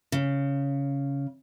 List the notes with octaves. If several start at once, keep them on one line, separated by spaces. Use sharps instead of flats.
C#3